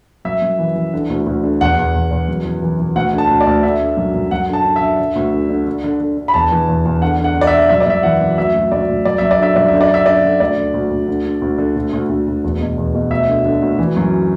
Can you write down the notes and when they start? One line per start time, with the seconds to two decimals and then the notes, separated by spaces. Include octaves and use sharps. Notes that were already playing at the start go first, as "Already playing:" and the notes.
0.25 F#2 E5
0.42 F#2
0.59 E3
0.76 E3
0.94 D3
1.10 D2
1.26 D2
1.43 D3
1.61 E2 F#5
1.78 E2
1.95 E2
2.11 E2
2.28 F#2
2.45 E3
2.63 E3
2.80 E3
2.96 D2 F#5
3.13 D3
3.18 A5
3.30 D2
3.41 D5
3.47 D2
3.63 D3 E5
3.80 D3
3.97 F#2
4.14 F#2
4.31 F#2 F#5
4.48 D3 A5
4.65 D3
4.76 E5
4.82 D3
5.00 D3
5.15 D2
5.33 D3
5.49 D3
5.67 D3
5.84 D3
6.00 D3
6.17 D3
6.28 B5
6.34 E2 A5
6.52 E3
6.68 E2
6.85 E2
7.02 D3 F#5
7.19 D3
7.24 F#5
7.36 D3
7.41 D5
7.47 E5
7.53 D3
7.69 F#2 E5
7.80 D5
7.87 F#2 E5
8.03 E3 F#5
8.21 F#2
8.38 D2 E5
8.54 D2
8.72 D2 D5
8.88 D2
9.05 F#2 D5
9.18 F#2 E5
9.31 D5
9.39 D3 E5
9.56 F#2 D5
9.68 D3 E5
9.81 D5
9.90 D3 E5
10.06 D3 D5
10.24 D3
10.40 D2 D5
10.58 D3
10.74 D2
10.91 D2
11.08 D3
11.25 D3
11.41 D2
11.58 D3
11.76 D2
11.93 D2
12.09 D2
12.27 D2
12.44 E2
12.61 B2
12.78 E2
12.94 B2
13.11 D2 E5
13.28 D3
13.45 D3
13.62 D2
13.79 E3
13.96 F#2